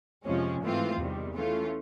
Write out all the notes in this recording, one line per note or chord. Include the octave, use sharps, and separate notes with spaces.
F2 C3 F3 G#3 C#4
G#2 E3 A3 C4 F4
E2 C3 D#3 G3
E3 A3 C#4 F4